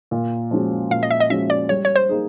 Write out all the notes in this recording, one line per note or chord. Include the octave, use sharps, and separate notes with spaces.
A#2
F3 G#3 C#4 F#4
A#2 F5
D#5
E5
D#5
F3 G#3 C#4 F#4 E5
D5
G3 C#5
C#5
C5
A#3 D#4 G#4